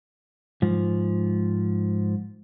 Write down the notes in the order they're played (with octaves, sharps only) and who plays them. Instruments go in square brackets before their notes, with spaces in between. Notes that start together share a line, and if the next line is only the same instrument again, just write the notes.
[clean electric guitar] G#2 F3